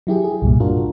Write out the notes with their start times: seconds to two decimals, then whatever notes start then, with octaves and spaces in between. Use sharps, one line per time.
0.07 F#3 E4 G4 G#4
0.24 G#4
0.42 C2 G2 A#2
0.60 D4 F4 F#4 A#4